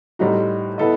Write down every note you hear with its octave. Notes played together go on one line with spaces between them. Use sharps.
A2 G3 C4 D#4 F#4
B3 E4 A4 D#5